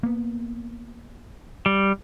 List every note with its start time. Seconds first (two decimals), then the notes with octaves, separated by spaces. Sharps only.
0.03 A#3 B3
1.66 G3